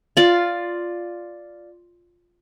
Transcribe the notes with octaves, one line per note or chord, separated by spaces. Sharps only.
F4 D5